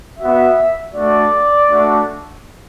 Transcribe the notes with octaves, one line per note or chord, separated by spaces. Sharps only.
B3 F#4 E5
A3 D4 F#4 D5
A3 D4 F#4